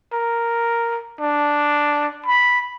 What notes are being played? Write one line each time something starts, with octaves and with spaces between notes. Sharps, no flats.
A#4
D4
B5